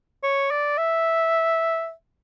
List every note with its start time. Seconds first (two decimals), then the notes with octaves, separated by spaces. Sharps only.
0.23 C#5
0.51 D5
0.78 E5